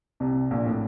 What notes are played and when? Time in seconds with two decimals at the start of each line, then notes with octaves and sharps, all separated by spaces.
0.20 C2 C3
0.51 A#1 A#2
0.66 A2